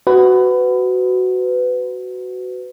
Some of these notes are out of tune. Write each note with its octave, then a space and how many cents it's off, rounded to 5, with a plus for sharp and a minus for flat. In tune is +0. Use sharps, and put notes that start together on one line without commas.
F#4 +10 B4 +25